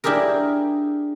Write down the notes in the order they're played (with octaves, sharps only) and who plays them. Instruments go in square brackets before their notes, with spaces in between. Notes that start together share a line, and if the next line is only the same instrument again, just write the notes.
[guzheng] D4 E4 G4 G#4 A#4